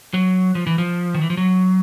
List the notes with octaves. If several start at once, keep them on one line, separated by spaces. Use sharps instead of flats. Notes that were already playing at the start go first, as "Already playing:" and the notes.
F#3
F3
E3
F3
D#3
E3
F3
F#3